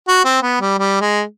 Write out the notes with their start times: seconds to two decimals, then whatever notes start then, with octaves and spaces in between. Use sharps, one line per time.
0.08 F#4
0.25 C4
0.42 B3
0.61 G3
0.79 G3
1.01 G#3